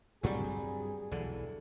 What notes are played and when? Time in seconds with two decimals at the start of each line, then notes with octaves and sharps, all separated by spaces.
0.23 D2 G2 F#3 G3 C4 G#4
1.12 B1 E2 D3 E3